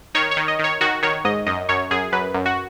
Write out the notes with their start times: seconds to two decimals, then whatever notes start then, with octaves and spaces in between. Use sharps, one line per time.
0.15 D#3 C#5
0.31 C#5
0.37 D#3
0.48 D#5
0.59 D#3
0.64 C#5
0.81 D#3 F#4
1.02 D#3 C#5
1.25 G#2 D#5
1.47 F#2 D#5
1.69 F#2 C#5
1.91 F#2 G#4
2.12 F#2 B4
2.34 F#2
2.46 F#4